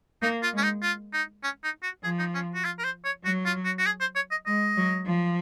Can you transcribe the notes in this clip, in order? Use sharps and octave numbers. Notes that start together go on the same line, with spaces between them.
A#3 D#4
F4
G#3
C#4
D#4
F4
D#4
C#4
D#4
F#4
F3 G#4
D#4
C#4
F#4
F4
A#4
C5
C#5
F#3 F#4
F4
F#4
F#4
G#4
C5
C#5
D#5
G#3 D#5
F#3
F3